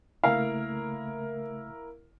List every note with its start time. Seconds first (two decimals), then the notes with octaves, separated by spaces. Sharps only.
0.24 C2 C#3 A3 A#3 E4 A#4 F5